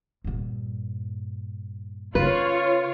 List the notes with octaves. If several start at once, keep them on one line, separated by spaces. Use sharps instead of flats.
G2 A#2
C#3 F4 B4 C#5